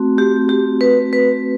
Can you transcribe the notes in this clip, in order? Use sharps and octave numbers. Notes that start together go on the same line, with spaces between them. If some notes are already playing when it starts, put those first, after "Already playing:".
Already playing: A3 C4 F#4
G4
G4
B4
B4